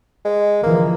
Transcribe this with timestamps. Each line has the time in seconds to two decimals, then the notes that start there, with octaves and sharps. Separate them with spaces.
0.25 G#3
0.63 D3 E3 F3 A#3